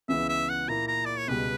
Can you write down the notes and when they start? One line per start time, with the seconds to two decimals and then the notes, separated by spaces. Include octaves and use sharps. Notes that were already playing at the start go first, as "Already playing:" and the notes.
0.08 C#2 C#3 E3 B3 E5
0.29 E5
0.49 F#5
0.68 A#2 A#3 E4 A#5
0.88 A#5
1.06 D5
1.17 C#5
1.28 C#2 B2 G3 B3 B4